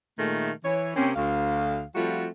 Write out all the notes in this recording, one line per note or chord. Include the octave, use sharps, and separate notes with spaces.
A#2 D#3 G#3 A3
E3 C#5
C3 A#3 C4 C#4
D2 F5
F3 G3 A3 C4 F4 F#4